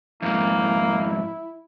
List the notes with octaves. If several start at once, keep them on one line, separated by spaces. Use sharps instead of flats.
F2 G#2 A#3 E4